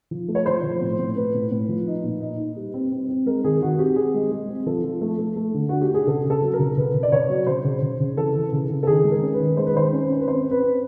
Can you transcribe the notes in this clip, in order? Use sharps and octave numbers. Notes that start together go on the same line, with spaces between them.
F3
A3
C#5
F3 C5
F3
A2
A2
A2 B4
A2
A2
F3
D#4
A#2
D#4
D#4
G3
C4
C4
C4
G#3 A#4
D#3 G#4
D#3 F#4
C4 G4
C4 G#4
G#3
G#3
C4
F3 A4
F3
A3
A3
A3
D3
D4 F#4
G4
D4 G#4
C#3 A4
C#3
A4
F#3
A#4
C#3
C#3 B4
C#3
D5
C#3 C#5
F#3
C#3 C5
C#3
C#3
C#3
E3 A4
E3
C#3
C#3
A4
D#3 G#4
G#3
A#4
C#4
B4
D#3
G#3 C5
B4
D#3 C5
C#4
C#4
B4
C4 C5
C4
B4
C4